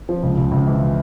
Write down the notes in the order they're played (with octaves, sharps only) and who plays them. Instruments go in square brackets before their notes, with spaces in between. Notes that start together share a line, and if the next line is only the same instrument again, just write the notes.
[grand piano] F3
C#2
C#2
C#2
E3